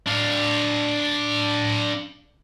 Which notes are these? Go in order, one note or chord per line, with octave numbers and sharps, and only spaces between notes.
D4 F5